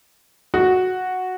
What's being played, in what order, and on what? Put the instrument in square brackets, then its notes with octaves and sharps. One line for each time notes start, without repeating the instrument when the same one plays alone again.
[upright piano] F#4